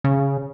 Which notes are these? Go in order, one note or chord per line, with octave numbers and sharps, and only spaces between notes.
C#3